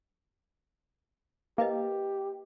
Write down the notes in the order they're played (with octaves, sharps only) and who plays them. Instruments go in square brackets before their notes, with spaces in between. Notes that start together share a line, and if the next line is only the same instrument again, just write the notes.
[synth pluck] A#3 [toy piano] E4 B4 D#5 [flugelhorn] G4